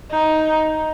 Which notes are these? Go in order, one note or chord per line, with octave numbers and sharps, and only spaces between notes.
D#4